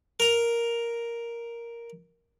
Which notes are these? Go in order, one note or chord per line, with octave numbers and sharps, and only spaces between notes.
A#4 A#5